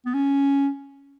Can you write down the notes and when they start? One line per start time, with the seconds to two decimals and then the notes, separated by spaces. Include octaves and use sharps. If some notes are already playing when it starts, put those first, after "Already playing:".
0.06 B3
0.14 C#4